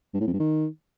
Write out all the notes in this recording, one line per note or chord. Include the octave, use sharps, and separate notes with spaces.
G2
A2
F2
G2
D#3